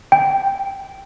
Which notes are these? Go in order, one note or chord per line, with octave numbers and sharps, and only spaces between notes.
G5